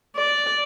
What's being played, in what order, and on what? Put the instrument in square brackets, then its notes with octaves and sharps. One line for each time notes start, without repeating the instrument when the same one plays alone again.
[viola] D5